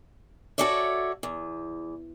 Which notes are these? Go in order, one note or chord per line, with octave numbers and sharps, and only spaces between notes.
F#4 G4 A4 C#5 D5 E5
E2